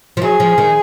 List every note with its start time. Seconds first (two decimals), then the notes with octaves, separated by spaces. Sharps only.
0.17 F3
0.22 F#3 G#4
0.40 F3
0.58 D#3